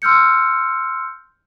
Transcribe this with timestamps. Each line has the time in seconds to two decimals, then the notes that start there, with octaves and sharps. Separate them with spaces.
0.02 C6 E6 F6 G6 C#7